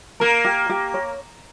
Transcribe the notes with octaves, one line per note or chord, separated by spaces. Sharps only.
A#3 A#4
G4
G4
C#5